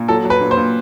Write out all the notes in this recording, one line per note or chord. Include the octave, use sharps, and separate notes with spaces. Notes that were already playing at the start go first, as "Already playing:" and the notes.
Already playing: A#2
F#3 A4
F#3
B4
A#2
C5
A#2